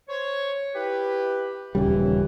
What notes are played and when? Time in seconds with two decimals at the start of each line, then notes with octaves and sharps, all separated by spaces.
0.09 C5 C#5
0.75 E4 G4 B4
1.75 D#1 F#2 C#3 E3 G3